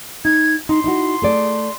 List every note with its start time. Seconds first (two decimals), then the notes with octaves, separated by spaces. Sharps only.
0.25 D#4 G#6
0.69 D#4 C6
0.84 D#4 E4 F#4
1.22 A3 G#4 D5